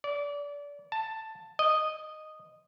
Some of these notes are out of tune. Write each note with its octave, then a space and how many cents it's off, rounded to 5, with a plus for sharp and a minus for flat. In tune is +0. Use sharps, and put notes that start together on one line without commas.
D5 -30
A5 +10
D#5 -5